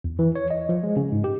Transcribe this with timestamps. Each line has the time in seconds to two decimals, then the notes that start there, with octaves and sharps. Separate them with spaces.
0.04 E2
0.19 E3
0.35 C#5
0.51 D#5
0.69 F3
0.83 G#3
0.97 C#3
1.12 G#2
1.24 G4